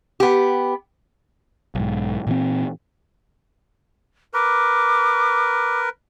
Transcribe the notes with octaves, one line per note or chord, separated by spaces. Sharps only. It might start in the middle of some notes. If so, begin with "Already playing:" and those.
B3 G4
B1 G#2
A#2 E3 C4
A#4 B4 D6